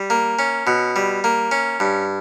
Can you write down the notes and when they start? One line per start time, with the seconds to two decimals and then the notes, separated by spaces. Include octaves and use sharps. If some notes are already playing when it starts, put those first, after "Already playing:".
Already playing: G3
0.10 A#3
0.39 C#4
0.67 B2
0.96 G3
1.24 A#3
1.51 C#4
1.80 G2